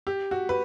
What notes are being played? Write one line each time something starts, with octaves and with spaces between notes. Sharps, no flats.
G4
F#4
B4